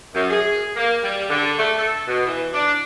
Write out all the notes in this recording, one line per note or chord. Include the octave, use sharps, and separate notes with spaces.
F#2
G#4
A#3
G3
D3
A3
A4
B2
E3
D4